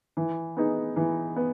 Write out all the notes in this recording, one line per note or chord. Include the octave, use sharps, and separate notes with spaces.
E3
B3 D#4 G#4
E3
B3